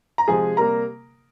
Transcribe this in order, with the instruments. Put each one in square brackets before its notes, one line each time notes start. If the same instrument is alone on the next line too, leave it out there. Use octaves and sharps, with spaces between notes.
[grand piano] A#5
C3 F3 G#3 G#4 G#5
C3 G3 A#3 A#4 A#5